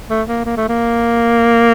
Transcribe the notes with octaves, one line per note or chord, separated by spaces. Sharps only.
A3
A#3
A#3
A3
A#3